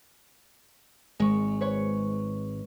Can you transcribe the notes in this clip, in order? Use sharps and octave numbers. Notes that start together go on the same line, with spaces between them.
G#1 G#3 C#6
B4 C#5 C#6